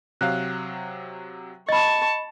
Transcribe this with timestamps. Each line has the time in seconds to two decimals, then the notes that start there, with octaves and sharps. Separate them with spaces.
0.21 C3 F#3 F5 F#6
1.69 D#5 A5 B5 C#6 A6